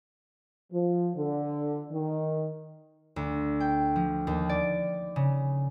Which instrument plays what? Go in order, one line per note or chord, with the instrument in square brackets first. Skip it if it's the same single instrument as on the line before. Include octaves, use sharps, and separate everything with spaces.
[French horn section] F3
D3
D#3
[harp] D2
G5
F3
D#2
D5
C#3